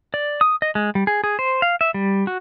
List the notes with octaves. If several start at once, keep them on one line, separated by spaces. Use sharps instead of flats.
D5
D#6
D#5
G#3
G3
G#4
G#4
C5
F5
E5
G3
F#4